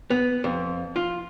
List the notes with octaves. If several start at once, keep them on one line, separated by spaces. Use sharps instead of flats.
B3
F2
F4